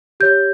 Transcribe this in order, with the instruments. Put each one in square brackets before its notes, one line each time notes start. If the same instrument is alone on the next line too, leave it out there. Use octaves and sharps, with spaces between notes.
[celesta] G4 C#5 G6